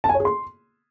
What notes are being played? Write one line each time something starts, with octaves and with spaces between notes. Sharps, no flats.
A5
G#5
C#5
G#4
C6